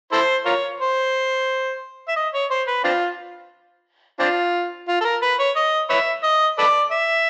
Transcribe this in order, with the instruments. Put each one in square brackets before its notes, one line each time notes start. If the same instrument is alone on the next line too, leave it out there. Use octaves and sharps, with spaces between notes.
[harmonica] E4 A4 C5
F4 A#4 C#5
C5
E5
D#5
C#5
C5
B4
C4 D4 F4
C4 D4 F4
F4
A4
A#4
B4
C#5
D#5
B4 C#5 E5
D#5
A4 B4 D5
E5